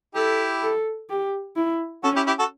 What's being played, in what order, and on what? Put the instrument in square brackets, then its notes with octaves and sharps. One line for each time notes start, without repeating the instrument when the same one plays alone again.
[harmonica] E4 G4 [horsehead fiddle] A4
[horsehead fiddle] A4
G4
E4
[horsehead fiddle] C#4 [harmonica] F#4 A4
[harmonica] E4 G4
E4 G4
F#4 A4